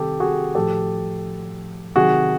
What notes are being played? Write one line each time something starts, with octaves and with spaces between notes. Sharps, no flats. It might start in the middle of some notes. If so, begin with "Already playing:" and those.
Already playing: C3 D#3 G3 G4 A4
F#4 G#4
A2 F3 G4 A4
C3 D#3 F#3 F#4 G#4